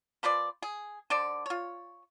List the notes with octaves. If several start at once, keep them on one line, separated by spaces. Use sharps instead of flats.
F3 B4 C5 D5
G#4
D3 C5 D5
F4 C#5